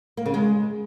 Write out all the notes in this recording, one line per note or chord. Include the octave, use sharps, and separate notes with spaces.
A#3
C#3
G#3